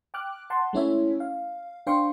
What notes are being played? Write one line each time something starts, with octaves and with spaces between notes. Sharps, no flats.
G5 D6 F6 F#6
F#5 A5 C6
G#3 A3 C#4 E4 C#5 E5
F5
D4 C5 F5 G5 C6 C#6